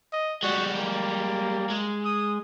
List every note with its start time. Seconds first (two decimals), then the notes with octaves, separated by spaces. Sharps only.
0.13 D#5
0.43 G3 G#3 F#4
0.77 A#3
1.70 G#3
2.05 D#6